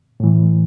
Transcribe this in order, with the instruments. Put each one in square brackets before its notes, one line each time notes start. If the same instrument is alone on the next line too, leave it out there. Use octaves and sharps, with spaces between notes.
[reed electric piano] A2 E3